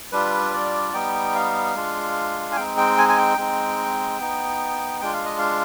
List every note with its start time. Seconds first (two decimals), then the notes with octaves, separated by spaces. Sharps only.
0.12 G3 D4 F4 B4
0.53 D5
0.93 G3 B3 D#4 G5
1.35 F5
1.75 G#3 D4 F4
2.52 G#5
2.56 G#3 C4 D#4 G5
2.77 G5
2.98 G#5
3.09 G#5
3.17 G5
3.38 G#3 C4 D#4
4.20 B3 D#4
5.01 G#3 D4 F4 G5
5.13 F5
5.25 D#5
5.38 F5